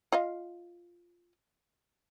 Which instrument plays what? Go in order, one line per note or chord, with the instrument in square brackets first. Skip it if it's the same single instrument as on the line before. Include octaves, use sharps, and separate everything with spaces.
[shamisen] F4 D#5 F5